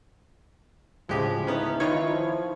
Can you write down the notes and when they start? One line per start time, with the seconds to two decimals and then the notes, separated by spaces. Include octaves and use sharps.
1.09 D2 A2 C#3 F3 G#3 G4 G#4
1.47 B3 C#4 D#4 E4
1.80 D#3 E3 D#4 F4 C#5
2.10 F3